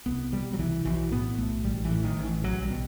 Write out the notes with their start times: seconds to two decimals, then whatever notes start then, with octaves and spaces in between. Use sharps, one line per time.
0.06 C2 B3
0.32 B2 G3
0.53 F#3
0.59 C2 E3
0.85 B1 E3
1.11 A2 B3
1.38 B1 A3
1.64 A1 G3
1.84 E3
1.91 A2
2.04 D#3
2.17 A1
2.24 E3
2.43 B1 F#3
2.63 G3
2.70 B2